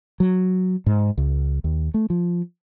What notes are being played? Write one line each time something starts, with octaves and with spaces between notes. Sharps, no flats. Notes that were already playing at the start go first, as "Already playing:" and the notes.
F#3
G#2
C#2
D#2
A3
F3